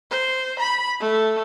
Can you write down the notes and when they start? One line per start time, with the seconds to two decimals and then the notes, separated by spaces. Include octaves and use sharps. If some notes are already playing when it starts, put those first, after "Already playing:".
0.11 C5
0.59 B5
1.00 A3